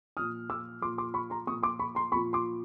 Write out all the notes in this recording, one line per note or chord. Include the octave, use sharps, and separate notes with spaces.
A#2 F3 D#6 F6
D6 E6
A#2 F3 C6 D6
C6 D6
B5 C#6
A#5 C6
A#2 F3 C#6 D#6
C6 D6
B5 C#6
A#5 C6
A#2 F3 B5 C#6
C6 D6